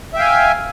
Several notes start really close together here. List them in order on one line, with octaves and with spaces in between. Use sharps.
E5 G5 F5 G#5